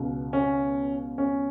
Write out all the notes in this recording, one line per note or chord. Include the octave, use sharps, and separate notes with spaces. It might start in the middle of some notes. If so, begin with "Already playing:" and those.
Already playing: C#2 B2
C#4
C#4